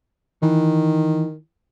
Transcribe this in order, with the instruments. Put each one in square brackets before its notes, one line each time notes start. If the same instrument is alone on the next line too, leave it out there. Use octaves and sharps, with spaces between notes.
[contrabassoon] D#3 [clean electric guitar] E3